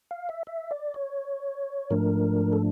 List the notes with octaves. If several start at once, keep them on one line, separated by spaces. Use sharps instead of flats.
F5
E5
E5
D5
C#5
G#2 F3 A3 D4 A#4
A4